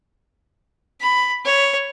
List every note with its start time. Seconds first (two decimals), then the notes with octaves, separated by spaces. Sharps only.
1.01 B5
1.45 C#5